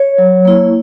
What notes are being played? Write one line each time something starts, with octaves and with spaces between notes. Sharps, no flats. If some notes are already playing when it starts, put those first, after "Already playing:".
Already playing: C#5
F#3
A#3 E4